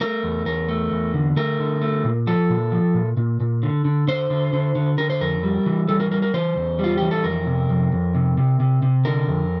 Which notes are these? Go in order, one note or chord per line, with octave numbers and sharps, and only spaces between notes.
A3 A#4
E2
E2 A#4
A3
E2
D3
A3 A#4
D3
A3
A#2
F3 A4
A#2
F3
A#2
A#2
A#2
D3
D3
D3 C5
D3
D3
D3
D3 A#4
C5
F2 A#4
G3
E3
G3 A4
A#4
G3 A#4
A#4
E3 C5
E2
G3 F4
E3 G4
A4
F2 A#4
C3
F2
F2
C3
C3
C3
C3
D3 A#4
F2